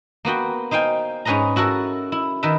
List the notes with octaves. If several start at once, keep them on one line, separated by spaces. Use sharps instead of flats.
A#3 B3 F#4 G5
D#4 C5 F5 G5 G#5
G#2 C#4 G#4 B4 D#5 A#5
E4 F#4 A4 A#4
E4
D#3 A#4 B4 E5